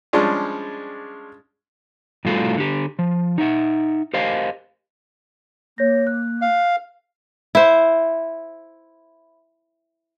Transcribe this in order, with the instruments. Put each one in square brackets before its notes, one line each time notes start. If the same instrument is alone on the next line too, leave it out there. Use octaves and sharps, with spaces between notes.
[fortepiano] F3 G3 G#3 C#4 D4 F4
[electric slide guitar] A2 G3 A3 F4 F#4 A4
D3 G4
F3
D#4 E5 F#5
G4 A#4 C5 D#5 F5
[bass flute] A#3 [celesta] C#5 G6 A#6
[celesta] F#6
[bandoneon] F5
[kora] E4 C5